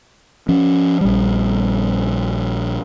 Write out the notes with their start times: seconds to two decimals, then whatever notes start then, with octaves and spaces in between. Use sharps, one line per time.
0.49 F3 C#4
1.01 A#1 G3